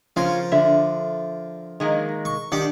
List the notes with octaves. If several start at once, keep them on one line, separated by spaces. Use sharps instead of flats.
C#3 F3 C#4 F4 A#4
D3 E5
D#3 G#3 A#3
C#6
D#3 D4 G4 F#5